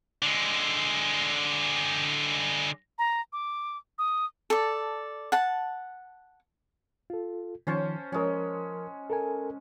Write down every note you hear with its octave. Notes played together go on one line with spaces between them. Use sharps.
D3 G#3
A#5
D6
D#6
A4 D5
F#5 A5
F4 A4
D#3 F3 C#4 C5 A5
F3 G#3 C#4 A#4
A4 A#4 G#5